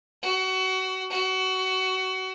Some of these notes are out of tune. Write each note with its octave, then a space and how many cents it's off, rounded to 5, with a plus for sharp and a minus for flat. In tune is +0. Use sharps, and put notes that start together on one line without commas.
F#4 +25
F#4 +25